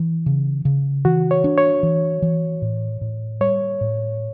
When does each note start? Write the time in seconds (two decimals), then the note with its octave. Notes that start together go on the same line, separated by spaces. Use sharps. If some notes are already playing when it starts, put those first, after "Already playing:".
Already playing: E3
0.26 C#3
0.65 C#3
1.05 E3 F#4
1.31 C#5
1.44 D4
1.58 C#5
1.83 E3
2.22 E3
2.62 A2
3.01 A2
3.41 G3 C#5
3.81 A2